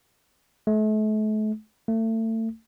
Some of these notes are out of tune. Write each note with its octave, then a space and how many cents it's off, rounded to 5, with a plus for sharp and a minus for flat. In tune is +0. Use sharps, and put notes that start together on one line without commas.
A3 -40
A3 +30